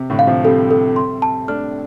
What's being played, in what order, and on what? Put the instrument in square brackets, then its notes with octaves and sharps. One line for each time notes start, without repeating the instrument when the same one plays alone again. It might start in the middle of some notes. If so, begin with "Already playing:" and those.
Already playing: [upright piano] C3
A2 D3
[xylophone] F5
[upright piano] C3 F3
[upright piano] G3 C4 [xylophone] A4
[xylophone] A4
C6
A5
[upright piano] A3 D4 [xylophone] F6